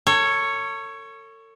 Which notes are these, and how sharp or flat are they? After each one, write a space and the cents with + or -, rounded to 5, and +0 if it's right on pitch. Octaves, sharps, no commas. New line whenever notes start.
A4 +40 C#5 +0